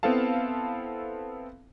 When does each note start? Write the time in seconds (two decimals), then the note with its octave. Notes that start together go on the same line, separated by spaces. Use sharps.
0.03 B3 C4 E4 A4 F5 A5